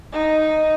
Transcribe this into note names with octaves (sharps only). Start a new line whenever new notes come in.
D#4